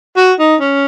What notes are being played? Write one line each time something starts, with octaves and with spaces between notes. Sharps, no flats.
F#4
D#4
C#4